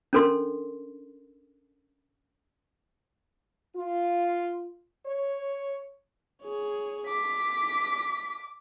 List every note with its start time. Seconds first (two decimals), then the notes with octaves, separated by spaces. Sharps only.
0.13 C#4 D4 A4 A#4 C6
3.76 F4
5.06 C#5
6.43 G#4 C#5
7.07 D6 B6